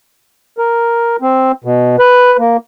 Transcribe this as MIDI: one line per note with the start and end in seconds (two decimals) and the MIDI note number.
0.58 1.16 70
1.22 1.52 60
1.64 1.96 47
1.99 2.37 71
2.39 2.57 58